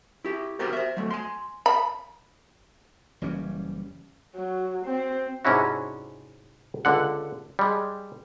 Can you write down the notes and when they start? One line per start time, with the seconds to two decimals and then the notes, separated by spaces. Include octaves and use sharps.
0.25 E4 G4
0.59 B3 F#4 G4 A#4 C5
0.73 C5 E5
0.97 F#3 A3
1.11 G#5 C6
1.66 B5
3.21 F#1 E3 G3 C#4
4.36 F#3
4.85 C4
5.45 G#2 C3 C#4 D4 E4 F#4
6.85 C#2 D3 F#5
7.59 G3 G#3